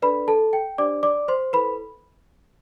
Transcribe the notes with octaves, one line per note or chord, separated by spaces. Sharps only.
D4 A4 B4 D5 B5
A4 A5
G5
D4 G4 C5 D5 D6
D5 D6
C5 C6
E4 A4 B4 C5 B5